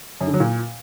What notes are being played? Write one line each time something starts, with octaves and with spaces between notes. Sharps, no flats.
F#2
D3
F#3
A#2